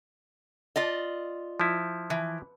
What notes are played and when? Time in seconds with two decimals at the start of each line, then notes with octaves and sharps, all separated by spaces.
0.76 F4 D5 D#5
1.60 F3 E4
2.10 E3